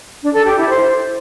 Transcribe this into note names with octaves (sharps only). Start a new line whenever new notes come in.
D4
A4
G4
E4
C5